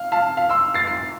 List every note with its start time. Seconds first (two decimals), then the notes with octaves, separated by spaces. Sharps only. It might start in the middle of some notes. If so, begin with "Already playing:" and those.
Already playing: F5
0.12 F5 A5
0.37 F5
0.49 C6 E6
0.74 A6 C7
0.87 C7